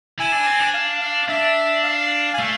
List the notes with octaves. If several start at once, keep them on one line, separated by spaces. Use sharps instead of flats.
E4 G#5
D4
C4
D4
F5
F5
D4 E5
F5
G#5
A3 F5